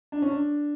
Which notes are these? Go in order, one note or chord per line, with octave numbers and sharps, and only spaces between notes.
D4
C#4
D4